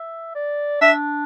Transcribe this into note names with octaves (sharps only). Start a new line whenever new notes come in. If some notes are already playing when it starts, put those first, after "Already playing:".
Already playing: E5
D5
D4 E5